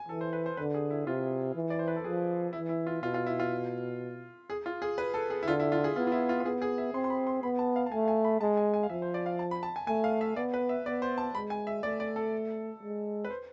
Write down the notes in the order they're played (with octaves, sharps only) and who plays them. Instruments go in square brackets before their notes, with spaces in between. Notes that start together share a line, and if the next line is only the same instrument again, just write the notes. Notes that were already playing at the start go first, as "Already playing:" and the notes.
Already playing: [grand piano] G#5
[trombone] E3 [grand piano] A4
[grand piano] C5
B4
C5
[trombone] D3 [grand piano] B4
[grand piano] G#4
E4
[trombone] C3 [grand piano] F4
[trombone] E3
[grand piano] D5
C5
B4
A4
[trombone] F3 [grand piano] G#4
[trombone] E3 [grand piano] E4
[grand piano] E4
F4
[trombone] B2 [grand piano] F4
[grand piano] F4
E4
F4
G#4
F4
G#4
B4
A4
G#4
E4
[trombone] D3 [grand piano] F4
[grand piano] E4
F4
G#4
[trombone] B3 [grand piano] F4
[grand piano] F4
E4
F4
F4
[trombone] B3 [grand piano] G#4
[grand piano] G#4
E5
[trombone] C4 [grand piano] C6
[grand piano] C6
B5
C6
[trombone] B3 [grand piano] B5
[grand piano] A5
F5
A5
[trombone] A3 [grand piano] G#5
[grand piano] F5
G#5
B5
[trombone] G#3 [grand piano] A5
[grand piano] G#5
G#5
F5
[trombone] F3 [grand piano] E5
[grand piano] C5
D5
F5
A5
B5
A5
G#5
[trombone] A3 [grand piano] G#5
[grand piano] F5
E5
[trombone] B3 [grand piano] D5
[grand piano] B4
E5
[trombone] B3 [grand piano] D5
[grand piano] C5
A5
[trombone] G#3 [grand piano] B5
[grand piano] G#5
E5
[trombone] A3 [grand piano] D5
[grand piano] D5
A4
[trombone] G#3
[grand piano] B4
C5